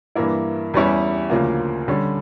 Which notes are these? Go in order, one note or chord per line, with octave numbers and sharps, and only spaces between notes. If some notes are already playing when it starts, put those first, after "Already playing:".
G2 E3 A#3 E4
E2 E3 G3 C#4 E4
D2 C#3 F3 A#3
D3 G3 C#4